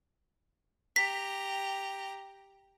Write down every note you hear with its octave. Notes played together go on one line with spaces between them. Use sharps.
G4 A#5 B6